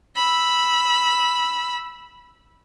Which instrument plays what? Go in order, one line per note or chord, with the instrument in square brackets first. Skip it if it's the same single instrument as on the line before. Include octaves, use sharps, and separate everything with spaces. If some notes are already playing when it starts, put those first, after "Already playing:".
[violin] B5 E6